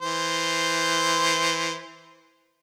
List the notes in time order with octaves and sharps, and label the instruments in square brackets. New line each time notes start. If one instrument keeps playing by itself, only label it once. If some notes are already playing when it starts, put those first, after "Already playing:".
[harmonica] E3 C5